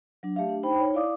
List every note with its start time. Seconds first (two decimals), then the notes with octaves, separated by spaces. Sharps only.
0.23 F#3 D4
0.36 A3 G4 E5 F5
0.49 D4
0.63 D#4 C5 G5 B5
0.80 D#4 C#5
0.94 E4 D5 F5 D6 D#6